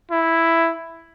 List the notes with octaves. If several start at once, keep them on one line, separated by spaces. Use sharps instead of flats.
E4